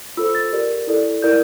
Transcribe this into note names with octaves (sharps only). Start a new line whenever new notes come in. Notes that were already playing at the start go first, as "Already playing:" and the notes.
F4 A4 C5 E6
A6
G4 A#4 D5
E4 A4 D5
E4 A#4 D5 G6